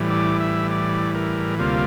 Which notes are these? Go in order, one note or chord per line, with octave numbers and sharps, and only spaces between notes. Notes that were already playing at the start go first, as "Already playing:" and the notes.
Already playing: A2 E3 G3
D5
E5
D5
A#4
D2 C3 G3 A#3 F4